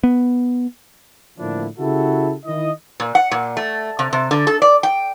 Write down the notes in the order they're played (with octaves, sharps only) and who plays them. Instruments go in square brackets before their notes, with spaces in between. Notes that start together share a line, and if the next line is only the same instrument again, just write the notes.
[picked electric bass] B3
[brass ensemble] A2 D3 F3 A#3 D4 E4
C#3 E4 F#4 G4 A4
D#3 E4 D#5
[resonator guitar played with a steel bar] A#2
F#5
A#2
A3
C3
C3
D3
A4
D5
G5